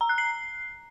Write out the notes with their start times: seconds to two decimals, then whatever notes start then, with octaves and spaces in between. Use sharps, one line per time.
0.01 A#5
0.09 F#6
0.18 C7